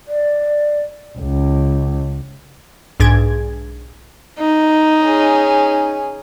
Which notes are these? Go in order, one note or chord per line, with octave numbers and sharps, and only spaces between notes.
D5
C#2
B1 G#2 D4 G#4 G#6
D#4
C#4 G#4